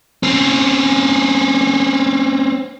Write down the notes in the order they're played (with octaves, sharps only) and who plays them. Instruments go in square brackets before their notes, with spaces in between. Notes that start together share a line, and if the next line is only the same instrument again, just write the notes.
[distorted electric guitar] C4 C#4